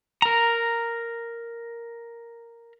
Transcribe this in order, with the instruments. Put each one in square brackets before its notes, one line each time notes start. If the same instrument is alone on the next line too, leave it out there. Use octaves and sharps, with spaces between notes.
[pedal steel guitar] A#4 A#5